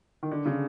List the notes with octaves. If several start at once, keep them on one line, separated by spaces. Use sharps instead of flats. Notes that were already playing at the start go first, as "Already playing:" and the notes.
D#3
D3
C#3